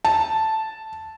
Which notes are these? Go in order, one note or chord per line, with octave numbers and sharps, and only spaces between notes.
A5